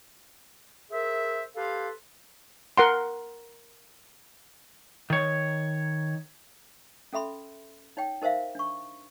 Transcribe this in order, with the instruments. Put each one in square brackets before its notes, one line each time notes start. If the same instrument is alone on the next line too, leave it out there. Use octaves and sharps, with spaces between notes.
[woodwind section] G#4 A#4 C5 E5
G4 A4 B4 C5 F5
[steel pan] A#4 F#5 C6
[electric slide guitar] D#3 C#5
[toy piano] C#4 A4 E5 B5 C6
D#4 C#5 G5
D#4 A#4 C5 E5 F5
D4 C#6